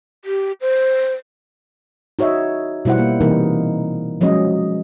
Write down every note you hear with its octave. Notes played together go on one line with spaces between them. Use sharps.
G4
C5
D#4 F#4 C#5 D#5 E5
B2 G3 E4 C5 F#5
A#3
C3 E3 G3 A#3 D#4 A#4
F3 F#3 G#3 C#4 D#5